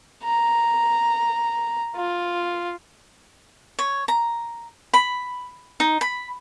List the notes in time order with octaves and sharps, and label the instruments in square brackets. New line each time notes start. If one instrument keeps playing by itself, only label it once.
[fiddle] A#5
F4
[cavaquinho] C#5
A#5
B5
D#4
B5